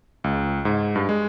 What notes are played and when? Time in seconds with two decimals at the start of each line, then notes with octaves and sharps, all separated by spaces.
0.24 C#2
0.65 G#2
0.96 G2
1.09 G#3